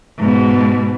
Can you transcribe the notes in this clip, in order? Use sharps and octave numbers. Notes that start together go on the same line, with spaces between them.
G#2 B2